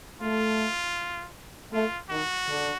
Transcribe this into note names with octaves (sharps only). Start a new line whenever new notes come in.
A3 F4
A3 F4
D#3 F#4
D3